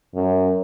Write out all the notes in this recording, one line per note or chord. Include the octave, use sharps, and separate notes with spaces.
F#2